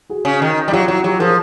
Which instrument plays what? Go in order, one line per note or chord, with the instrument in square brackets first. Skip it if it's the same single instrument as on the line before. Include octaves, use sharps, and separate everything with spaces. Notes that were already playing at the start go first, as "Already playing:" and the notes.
[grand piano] F#4 G#4
[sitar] C#3
D#3
G3
[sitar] F#3 [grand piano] F4 G4
[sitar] F#3 [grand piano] E4 F#4
[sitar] F#3 [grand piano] F4 G4
[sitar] F3 [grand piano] G#4 A#4